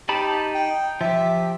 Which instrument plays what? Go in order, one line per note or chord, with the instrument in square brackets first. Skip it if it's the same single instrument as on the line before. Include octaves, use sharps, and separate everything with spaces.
[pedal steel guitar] D#4 A5 B5 [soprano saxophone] G4
[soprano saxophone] G5
[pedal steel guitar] F3 G4 [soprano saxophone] E5